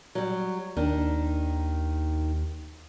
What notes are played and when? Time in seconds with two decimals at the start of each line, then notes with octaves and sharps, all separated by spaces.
0.15 F#3 G3
0.77 D#2 D#3 D4